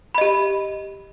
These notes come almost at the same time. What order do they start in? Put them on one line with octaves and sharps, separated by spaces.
B5 D#5 G4